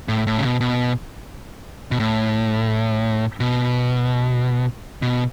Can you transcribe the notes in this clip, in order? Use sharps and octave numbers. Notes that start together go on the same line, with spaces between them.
A2
A2
C#3
B2
B2
B2
A2
B2
B2